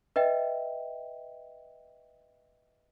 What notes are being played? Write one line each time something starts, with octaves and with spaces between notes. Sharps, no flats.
B4 D#5 E5 G5